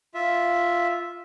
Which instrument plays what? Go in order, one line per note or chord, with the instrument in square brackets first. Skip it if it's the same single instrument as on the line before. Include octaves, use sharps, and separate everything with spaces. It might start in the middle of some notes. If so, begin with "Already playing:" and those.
[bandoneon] F4 E5